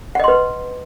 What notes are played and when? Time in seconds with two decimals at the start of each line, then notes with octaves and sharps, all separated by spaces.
0.15 F#5
0.20 D#5
0.24 C6
0.28 B4